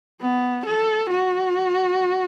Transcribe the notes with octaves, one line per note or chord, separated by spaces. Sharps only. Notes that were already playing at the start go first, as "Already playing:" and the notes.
B3
A4
F#4